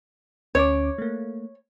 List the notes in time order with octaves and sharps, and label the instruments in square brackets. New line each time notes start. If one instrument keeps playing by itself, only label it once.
[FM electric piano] D2 C#4 D6 [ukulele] C#5
[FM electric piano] A3 A#3